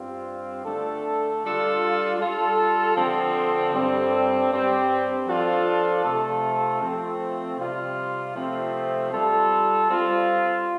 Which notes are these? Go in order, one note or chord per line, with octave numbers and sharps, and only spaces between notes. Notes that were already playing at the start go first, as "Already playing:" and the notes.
Already playing: G2 G3 C4 F4
D3 A3 D4 A4
G3 D4 F4 A4
G3 F4 A4
D3 F3 C4 A4
G2 G3 C4 A4
G2 G3 C4 G4
F3 D4 F4 A4
C3 A3 F4 A4
F3 A3 C4
C3 G3 F4
C3 F3 A3 C4
G3 F4 A4
G3 C4 F4